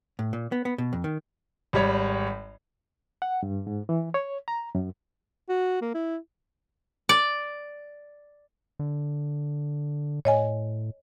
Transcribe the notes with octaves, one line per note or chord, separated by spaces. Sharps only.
A2
A#2
B3
B3
B2
F2
D#3
G#1 G3 C#5
F#5
G2
G#2
E3
C#5
A#5
F#2
F#4
A#3
E4
D5
D3
A2 C#5 D#5 G#5